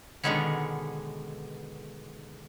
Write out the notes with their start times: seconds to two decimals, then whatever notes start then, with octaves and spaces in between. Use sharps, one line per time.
0.24 B2 D3 D#3 G#3 B3 C#4